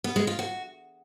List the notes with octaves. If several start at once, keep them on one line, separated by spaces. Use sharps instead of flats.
B3
G#3
F4
F#4